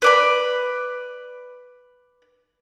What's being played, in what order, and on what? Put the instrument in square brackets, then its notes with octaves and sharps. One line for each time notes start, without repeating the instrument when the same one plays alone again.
[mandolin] B4 D5 B5